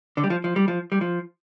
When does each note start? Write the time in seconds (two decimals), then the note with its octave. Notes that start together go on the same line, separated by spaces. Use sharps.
0.17 D3
0.24 G3
0.30 F3
0.44 F3
0.56 G3
0.68 F3
0.92 G3
1.01 F3